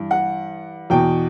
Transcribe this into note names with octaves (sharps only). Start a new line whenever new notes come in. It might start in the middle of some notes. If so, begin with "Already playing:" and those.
Already playing: G2 E3
F#5
E2 B2 G5